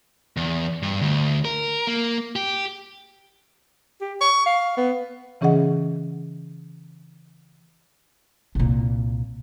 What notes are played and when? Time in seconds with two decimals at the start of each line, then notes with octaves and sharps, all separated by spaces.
0.37 E2
0.83 G2
1.02 D2
1.45 A#4
1.87 A#3
2.36 G4
4.01 G4
4.21 C#6
4.46 F5
4.77 B3
5.41 C#3 E3 C#4 G#4 D#5 F#5
8.55 C2 A#2